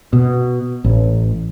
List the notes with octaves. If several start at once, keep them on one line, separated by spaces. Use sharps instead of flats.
B2
A1